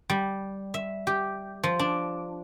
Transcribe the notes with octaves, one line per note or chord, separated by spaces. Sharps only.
G3
E5
G4
F3
D4